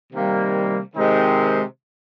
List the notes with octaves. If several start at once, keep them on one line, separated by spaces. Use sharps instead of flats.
C3 D#3 G3 A#3
C3 D#3 G#3 C4 D#4